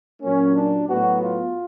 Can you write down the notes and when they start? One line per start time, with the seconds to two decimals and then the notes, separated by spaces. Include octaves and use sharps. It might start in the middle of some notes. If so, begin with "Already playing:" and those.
0.22 A#2 F#3 A#3 C#4
0.56 D4
0.89 A2 F#3 B3 F#4
1.23 F4